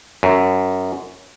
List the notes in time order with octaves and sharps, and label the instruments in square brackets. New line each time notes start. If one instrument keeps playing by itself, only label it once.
[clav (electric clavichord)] F#2